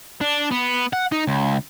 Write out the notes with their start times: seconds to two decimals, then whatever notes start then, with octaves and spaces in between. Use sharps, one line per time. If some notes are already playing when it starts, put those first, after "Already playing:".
0.21 D4
0.51 B3
0.93 F#5
1.12 D#4
1.27 C#2